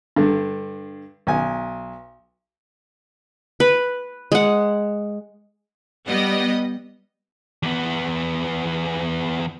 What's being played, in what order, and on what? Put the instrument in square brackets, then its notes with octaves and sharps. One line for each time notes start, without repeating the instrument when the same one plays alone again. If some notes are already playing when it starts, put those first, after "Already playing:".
[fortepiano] G2 D3
B1 G#5
[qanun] B4
G#3 F#5
[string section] G3 B3 D#5
[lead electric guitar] E2 B3